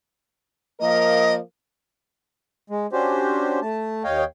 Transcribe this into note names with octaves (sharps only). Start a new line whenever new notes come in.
F3 A#3 A#4 D#5
G#3
C#4 D4 F#4 G4 C5
A3 A5
D#2 C#5 D#5 F5 G5